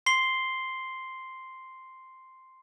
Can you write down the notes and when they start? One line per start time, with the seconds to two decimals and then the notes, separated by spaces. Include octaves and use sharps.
0.06 C6 C7 G7